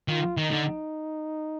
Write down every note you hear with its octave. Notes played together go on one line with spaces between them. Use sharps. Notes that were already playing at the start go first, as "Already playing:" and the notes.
D#3 F4
D#3 D#4
D3